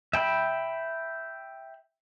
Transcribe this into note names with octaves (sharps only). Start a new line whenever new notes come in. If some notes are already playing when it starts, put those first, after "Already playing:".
E5 G5 B5